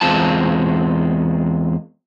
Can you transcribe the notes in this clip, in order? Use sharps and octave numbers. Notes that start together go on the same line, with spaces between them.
E2 G#3 C4 F4 A5